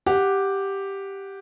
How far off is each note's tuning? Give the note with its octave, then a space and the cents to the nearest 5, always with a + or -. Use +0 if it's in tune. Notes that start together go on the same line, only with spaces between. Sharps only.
G4 +0 F#5 +0